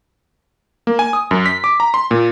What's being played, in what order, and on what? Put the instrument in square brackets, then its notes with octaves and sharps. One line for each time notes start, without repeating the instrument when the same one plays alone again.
[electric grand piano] A#3
G#5
D#6
F#2
B6
D6
A#5
C6
A#2